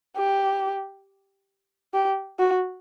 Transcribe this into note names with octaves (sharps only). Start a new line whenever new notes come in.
G4
G4
F#4